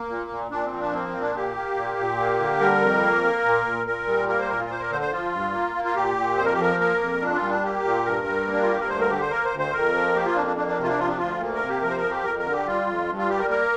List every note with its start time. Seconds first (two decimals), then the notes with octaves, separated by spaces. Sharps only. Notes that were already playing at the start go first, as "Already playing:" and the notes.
Already playing: A#3
0.09 A#2
0.30 A#2
0.51 A#2 D4
0.65 C4
0.72 F3
0.79 D4
0.93 A#3 C4
1.08 C4
1.14 A#2
1.21 D4
1.35 A#3 G4
1.56 A#3
1.76 A#2
1.98 A#2
2.19 A#3
2.40 D3
2.60 G3 A#4
2.82 F2
3.03 A#3
3.23 A#3
3.45 A#2
3.65 A#2
3.86 A#2 A#4
4.07 G3
4.28 A#3 A#4
4.39 C5
4.49 A#2 A#4
4.60 F4
4.70 A#3 C5
4.80 A#4
4.91 D3 C5
5.01 C5
5.12 F3 F4
5.33 G2
5.54 A#3
5.75 A#3
5.85 F4
5.96 A#2 G4
6.16 A#2
6.38 F2 C5
6.45 A#4
6.53 G4
6.59 F3 A#4
6.79 A#3 A#4
7.01 F2
7.21 A#2 D4
7.35 F4
7.42 G3
7.49 D4
7.63 A#3 G4
7.85 A#2
8.05 G2 A#4
8.26 G3
8.47 A#3
8.53 D4
8.62 F4
8.68 G2 G4
8.80 A#4
8.89 D2 C5
9.00 A#4
9.10 D3 G4
9.21 C5
9.31 A#3 A#4
9.45 C5
9.52 D2
9.59 C5
9.73 F2 A#4
9.94 F3
10.15 A#3 G4
10.26 F4
10.36 F2 D4
10.47 D4
10.57 A#3 D4
10.67 D4
10.78 C3
10.83 F4
10.89 D4
10.99 F3 F4
11.08 D4
11.18 D2 F4
11.41 A#3
11.55 A#4
11.61 C3
11.69 G4
11.83 F3 A#4
11.90 C5
11.97 A#4
12.04 F2
12.11 G4
12.24 F2 A#4
12.39 A#4
12.45 D3
12.52 G4
12.66 G3 F4
12.87 F2
13.08 G2
13.18 F4
13.29 G3 G4
13.39 A#4
13.50 A#3 A#4